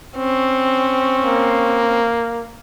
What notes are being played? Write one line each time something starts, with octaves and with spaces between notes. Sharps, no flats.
C4 C#4
A#3